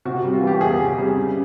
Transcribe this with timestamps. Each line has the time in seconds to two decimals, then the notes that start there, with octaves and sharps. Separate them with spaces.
0.05 C3 F#4
0.24 G3
0.33 F4
0.42 E3 G4
0.61 E2 G#4
0.79 C3 G#4
0.98 G3 G#4
1.17 C#3